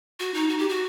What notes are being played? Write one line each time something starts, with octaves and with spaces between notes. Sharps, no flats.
F#4
D#4
F#4
G4
F#4